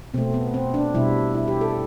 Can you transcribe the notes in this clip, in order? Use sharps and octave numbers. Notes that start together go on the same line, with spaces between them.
B2 A3 C4
B3
C4
D4
B2 G3 E4
E4
G4
A4